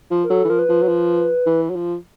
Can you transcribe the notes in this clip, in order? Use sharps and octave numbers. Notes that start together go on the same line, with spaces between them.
F3
A#4
F#3 A4
E3
F3 A#4
B4
F3
F#3
F3
E3
F#3
F3